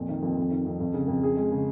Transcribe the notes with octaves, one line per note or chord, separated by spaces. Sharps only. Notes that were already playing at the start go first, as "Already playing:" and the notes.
Already playing: F2 A#2
D#3
F2
F2
D#3
F2
F2
C#3
F2
G#4
G#3
C#3